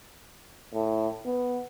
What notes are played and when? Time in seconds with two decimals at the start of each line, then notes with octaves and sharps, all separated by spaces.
0.74 A2
1.25 B3